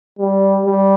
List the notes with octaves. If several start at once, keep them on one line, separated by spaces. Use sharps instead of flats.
G3
G3